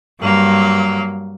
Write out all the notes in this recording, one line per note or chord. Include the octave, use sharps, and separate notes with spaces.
G2 F#3 A#3